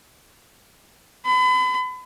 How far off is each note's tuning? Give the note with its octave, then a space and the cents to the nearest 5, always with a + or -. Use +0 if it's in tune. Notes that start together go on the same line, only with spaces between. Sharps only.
B5 +35